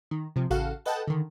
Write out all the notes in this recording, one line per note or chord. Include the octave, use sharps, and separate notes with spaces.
D#3
C3 F3
A1 C#3 F#4 A4 F5 F#5
A4 B4 D#5 F#5 G5 A5
D3 D#3